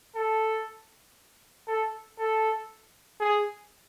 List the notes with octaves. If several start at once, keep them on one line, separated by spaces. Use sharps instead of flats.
A4
A4
A4
G#4